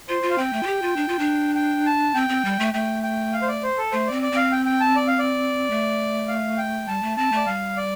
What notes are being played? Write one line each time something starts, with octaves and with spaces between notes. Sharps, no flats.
F4 C5
F4
F5
C4 G5
A3
F4
G4
F4
D4
F4
D4
G5
A5
C4 G5
C4
G3
A3
A3 G5
G5
F5
C5
D5
C5
A4
A3 C5
C4 D5
D5
C4 F5
G5
G5
A5
D5
F5
D5
A3
F5
G5
G3 A5
A3
C4 A5
A3 D5
G3 F5
D5